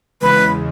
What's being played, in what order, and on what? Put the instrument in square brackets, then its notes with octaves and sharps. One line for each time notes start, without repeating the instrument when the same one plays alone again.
[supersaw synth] E2 C#3 G#3 [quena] B4